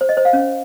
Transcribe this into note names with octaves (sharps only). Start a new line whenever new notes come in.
C5
D#5
C5
F5
C#4